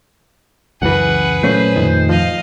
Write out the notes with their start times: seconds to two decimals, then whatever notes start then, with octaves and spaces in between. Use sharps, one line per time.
0.82 C#2 F#2 E3 G#4 B4 F#5
1.43 A#2 F#3 A3 C#4 C5
1.76 F2 A2 D#3
2.09 F3 D#5 F5